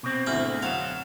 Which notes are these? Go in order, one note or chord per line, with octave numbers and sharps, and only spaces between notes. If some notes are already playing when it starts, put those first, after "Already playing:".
B2 C4
D2 G#2 A3 E4 F6
F#2 F5 F#5 E7